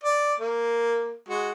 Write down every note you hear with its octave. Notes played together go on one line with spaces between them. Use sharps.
D5
A#3
G#3 F#4